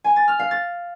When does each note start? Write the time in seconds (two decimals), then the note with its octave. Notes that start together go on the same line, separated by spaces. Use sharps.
0.04 G#5
0.16 A6
0.28 F6
0.39 F5
0.51 A6